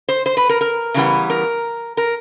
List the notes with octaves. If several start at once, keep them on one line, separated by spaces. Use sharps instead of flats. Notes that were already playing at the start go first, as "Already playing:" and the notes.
C5
C5
B4
A#4
A#4
C#3 E3 G3 B3
A#4
A#4